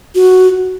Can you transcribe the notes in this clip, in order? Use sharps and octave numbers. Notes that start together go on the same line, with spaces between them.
F#4